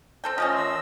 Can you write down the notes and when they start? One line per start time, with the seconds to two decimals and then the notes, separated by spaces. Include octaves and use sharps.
0.24 C4 A4 G5
0.38 F3 A3 C#4 D#5
0.53 D#3 C6 E6